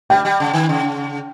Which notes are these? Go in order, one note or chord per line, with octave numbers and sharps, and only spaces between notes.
G3 G5
G3
C#3
D#3
C#3